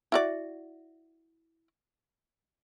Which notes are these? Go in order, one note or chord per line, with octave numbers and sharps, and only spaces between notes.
E4 F#4 D5